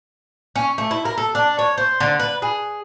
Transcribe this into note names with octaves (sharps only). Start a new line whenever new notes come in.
C#4
A3
E4
A#4
A4
D4
C#5
C5
D3
B4
G#4